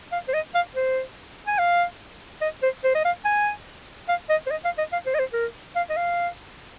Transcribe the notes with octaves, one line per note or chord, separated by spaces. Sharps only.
F5
C5
D#5
F5
C5
G#5
F5
D#5
C5
C5
D#5
F5
G#5
F5
D#5
C5
D#5
F5
D#5
F5
C5
D#5
C5
A#4
F5
D#5
F5